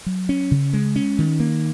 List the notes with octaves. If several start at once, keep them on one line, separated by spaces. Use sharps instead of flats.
F#3
C#4
C#3
G#3
C#4
D#3
A#3